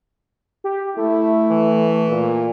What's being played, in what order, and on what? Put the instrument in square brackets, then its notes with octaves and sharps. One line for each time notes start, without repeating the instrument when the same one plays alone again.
[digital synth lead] G4
[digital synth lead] A3 [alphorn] E4
[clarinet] E3
[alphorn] A#2